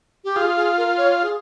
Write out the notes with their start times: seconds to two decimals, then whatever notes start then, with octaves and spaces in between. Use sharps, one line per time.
0.24 G4
0.36 F4 G#4
0.57 G#4
0.78 A#4
0.98 C#5
1.22 G#4